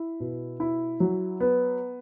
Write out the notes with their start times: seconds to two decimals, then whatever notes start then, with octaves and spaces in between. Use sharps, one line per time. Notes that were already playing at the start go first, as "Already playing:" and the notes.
Already playing: E4
0.20 B2
0.60 E4
1.00 F#3
1.40 B3